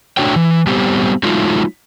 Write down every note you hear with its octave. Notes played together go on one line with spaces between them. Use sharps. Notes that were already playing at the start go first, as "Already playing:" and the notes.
A3 D4 F#4 C#5 G5
E3
G3 B3 C4 G4
F#3 G#3 A3 D#4 F4